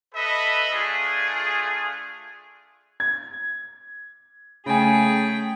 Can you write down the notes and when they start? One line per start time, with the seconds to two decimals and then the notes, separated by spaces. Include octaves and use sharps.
0.13 A4 B4 D#5 E5 B5
0.71 A3 D4 F4 G#4
3.00 G#6
4.66 C#3 A3 G#4 G5 G#5